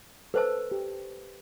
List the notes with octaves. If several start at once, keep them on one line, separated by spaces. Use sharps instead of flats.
A4 B4 C5 A5
G4